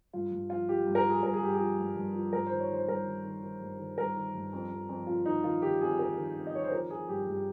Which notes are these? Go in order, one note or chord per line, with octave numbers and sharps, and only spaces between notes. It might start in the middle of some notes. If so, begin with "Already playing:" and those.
G2 F4
G2
F3 F4
F3 G4
G2
A#4
F3 G#4
G2 A#4
G#4
G2 G4
G#4
F3
G2
G2
F3
G2 A#4
D#3 C5
C#5
D#3 C5
G2 A#4
D#3
D#3
D#3
G2
D#3
G2 A#4
D#3
G2
F2
F2
F2
F2 F4
D#3 D#4
D#3 F4
D#3 G4
F2 G#4
F2 A#4
D#3
F2
D#5
D#3 C#5
C5
F3 A#4
F3 G#4
G2 G4
G#4
G2
G4